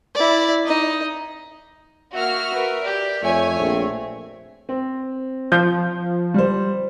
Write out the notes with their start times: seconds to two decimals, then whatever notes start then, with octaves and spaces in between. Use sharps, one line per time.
0.15 E4 D5
0.65 D#4 D#5
2.14 A#3 F#4 E5 F6
2.52 A#4 B4
2.84 G4 D5
3.23 F2 A3 C#5 E5 G#5
3.60 A#1 C4
4.69 C4
5.52 F3 G6
6.34 G3 C5